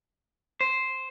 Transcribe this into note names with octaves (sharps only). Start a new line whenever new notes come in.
C5